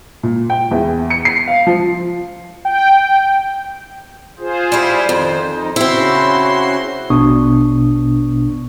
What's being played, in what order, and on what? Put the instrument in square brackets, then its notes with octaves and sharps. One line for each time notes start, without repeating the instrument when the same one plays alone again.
[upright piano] A#2
G5
E2
C#7
C7
F5
F3
[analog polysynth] G5
[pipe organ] F4 G#4 C5
[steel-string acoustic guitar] G3 E4
[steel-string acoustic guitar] F2 [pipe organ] D#3 C5
[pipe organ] D#4
[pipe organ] C#3 F#4 C6 [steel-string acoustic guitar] C4 E4
[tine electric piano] A#1 B2 B3 D4 C#6 D#6